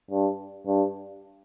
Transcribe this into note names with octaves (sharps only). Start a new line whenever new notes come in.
G2
G2